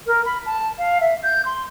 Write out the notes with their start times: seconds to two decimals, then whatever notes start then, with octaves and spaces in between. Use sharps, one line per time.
0.07 A#4
0.24 B5
0.45 A5
0.78 F5
1.00 E5
1.22 G6
1.45 C6